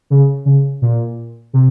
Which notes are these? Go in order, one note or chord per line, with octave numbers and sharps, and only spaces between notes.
C#3
C#3
A#2
C3